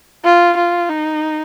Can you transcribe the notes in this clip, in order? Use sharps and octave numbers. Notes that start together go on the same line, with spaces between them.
F4
F4
D#4